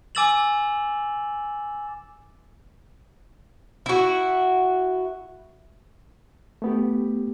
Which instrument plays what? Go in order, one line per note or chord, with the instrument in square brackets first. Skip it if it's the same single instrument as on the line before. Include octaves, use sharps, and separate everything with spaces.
[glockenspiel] G#5 D6 E6 A6 E7 F#7
[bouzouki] E4 F#4
[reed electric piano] A3 B3 G4